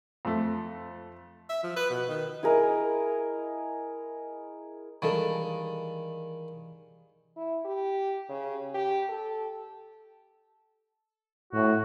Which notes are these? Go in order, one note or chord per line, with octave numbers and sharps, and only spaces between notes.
F2 A3
E5
F3
B4
B2
D#3
E4 G#4 A#4 D#5
D#3 E3 G3 G#3 A4 F5 B5
E4
G4
C#3
G4
A4
A2 F#4